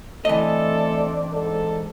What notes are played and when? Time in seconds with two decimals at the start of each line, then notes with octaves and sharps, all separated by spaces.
0.25 E3 A3 C4 D4 A4 D#5
1.33 G#2 A4